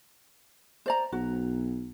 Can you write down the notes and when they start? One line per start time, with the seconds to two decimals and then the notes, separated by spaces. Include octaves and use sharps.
0.86 C5 D5 A#5
1.12 B1 F#4